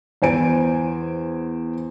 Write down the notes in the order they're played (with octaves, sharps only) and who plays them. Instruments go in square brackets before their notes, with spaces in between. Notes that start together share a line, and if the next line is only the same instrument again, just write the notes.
[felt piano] E2 C5 G#5 D7